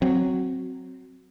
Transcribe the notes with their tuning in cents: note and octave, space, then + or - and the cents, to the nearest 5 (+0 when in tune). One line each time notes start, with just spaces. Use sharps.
F#3 +0 C4 +0